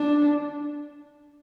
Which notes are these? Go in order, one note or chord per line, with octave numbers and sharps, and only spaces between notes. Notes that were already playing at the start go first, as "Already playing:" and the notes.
Already playing: D4